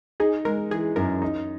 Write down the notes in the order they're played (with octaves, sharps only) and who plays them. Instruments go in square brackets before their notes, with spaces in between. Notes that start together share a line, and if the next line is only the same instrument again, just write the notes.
[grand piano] D#4 [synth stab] G#4
[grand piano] G#3 [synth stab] A#4
[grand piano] E3 [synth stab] G#4
[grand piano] F#2 [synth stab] A#4
[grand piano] D#4